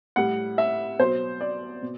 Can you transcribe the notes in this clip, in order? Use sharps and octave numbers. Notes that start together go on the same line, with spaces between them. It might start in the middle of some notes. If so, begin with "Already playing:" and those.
A2 G3 F#5
E5
B2 F#3 C5
D5
B2